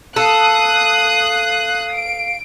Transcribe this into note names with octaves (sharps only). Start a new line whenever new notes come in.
A4 F5 D#6 F#6
D7